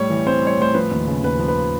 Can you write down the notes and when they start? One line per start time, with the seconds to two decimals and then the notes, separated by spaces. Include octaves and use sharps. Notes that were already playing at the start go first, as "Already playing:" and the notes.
Already playing: A2 G3 C#5
0.10 E3
0.27 C4 C5
0.42 G3 C#5
0.59 A2 C5
0.74 F3 B4
0.91 D#2
1.07 C#3
1.23 D#2 B4
1.39 F3
1.48 B4